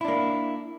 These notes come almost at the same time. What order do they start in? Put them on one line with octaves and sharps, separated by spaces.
E4 D4 A#3